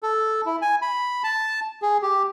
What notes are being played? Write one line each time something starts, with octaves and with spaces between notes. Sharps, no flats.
A4
E4
G#5
B5
A5
G#4
G4